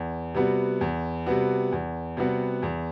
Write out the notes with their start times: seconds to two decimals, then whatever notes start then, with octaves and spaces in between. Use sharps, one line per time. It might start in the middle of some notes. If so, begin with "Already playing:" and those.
Already playing: E2
0.34 C3 G3 B3 F#4
0.81 E2
1.26 C3 G3 B3 F#4
1.72 E2
2.17 C3 G3 B3 F#4
2.62 E2